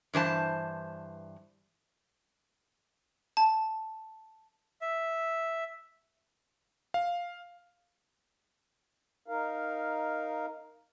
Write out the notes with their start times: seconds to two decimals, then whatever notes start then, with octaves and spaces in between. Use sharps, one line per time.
0.14 G2 E3 C5 A5
3.37 A5
4.81 E5
6.94 F5
9.28 D#4 A#4 F5